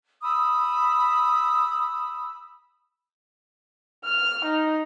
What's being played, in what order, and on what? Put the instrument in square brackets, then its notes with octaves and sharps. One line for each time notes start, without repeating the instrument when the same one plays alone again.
[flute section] B5 D#6 E6
[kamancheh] F6
D#4